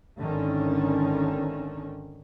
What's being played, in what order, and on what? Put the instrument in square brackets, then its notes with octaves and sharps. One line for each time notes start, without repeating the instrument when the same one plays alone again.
[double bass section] G#1 D3 D#3 C#4